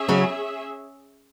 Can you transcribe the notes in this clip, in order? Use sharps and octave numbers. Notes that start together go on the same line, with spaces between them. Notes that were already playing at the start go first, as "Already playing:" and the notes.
Already playing: C#4 G#4 E5
C#3 F#3